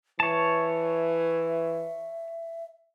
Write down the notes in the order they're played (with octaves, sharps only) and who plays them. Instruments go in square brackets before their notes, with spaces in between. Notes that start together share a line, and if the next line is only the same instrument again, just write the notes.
[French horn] E3 [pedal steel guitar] C#5 A5 [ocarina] E5